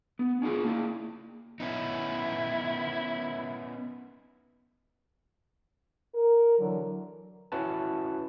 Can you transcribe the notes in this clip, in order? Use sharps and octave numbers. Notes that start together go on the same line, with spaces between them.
B3
C#4 D#4 F4 G#4
A#3 E4
B3 C#4 D#4 E4
A#4
D3 E3 F#3
C#4 E4 F#4 B4 A5